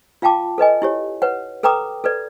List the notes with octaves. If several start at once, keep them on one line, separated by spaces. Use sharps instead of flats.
F4 F5 G5 A5 D6
A4 B4 D#5 G#5
E4 G4 C#5
B4 C#5 F#5
A4 B4 G5 A#5 D6 D#6
A4 B4 D5